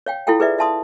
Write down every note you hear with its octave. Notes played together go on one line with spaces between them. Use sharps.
C#5 F5 G5
E4 F4 A4 F5 G5
G#4 B4 D5 E5
E5 F5 A5 C6 D#6